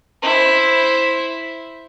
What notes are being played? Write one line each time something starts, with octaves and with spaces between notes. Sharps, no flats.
E4 C5